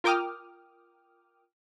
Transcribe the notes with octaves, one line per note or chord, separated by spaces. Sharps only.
F4 A#4 G5 D6 D#6 F6